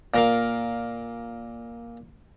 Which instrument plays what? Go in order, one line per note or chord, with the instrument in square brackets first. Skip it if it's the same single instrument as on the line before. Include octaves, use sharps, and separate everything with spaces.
[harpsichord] A#2 A#4 F5